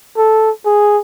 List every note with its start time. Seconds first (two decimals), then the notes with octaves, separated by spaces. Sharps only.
0.17 A4
0.65 G#4